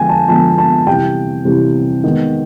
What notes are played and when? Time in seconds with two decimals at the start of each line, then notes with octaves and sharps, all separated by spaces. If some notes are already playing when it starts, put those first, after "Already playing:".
Already playing: D3 F3 G#3 B3 G5 G#5
0.09 A5
0.28 D3 F3 G#3 B3 A5
0.58 A5
0.87 C3 E3 G3 G5
1.45 C3 E3 G3
2.04 D#3 G#3 B3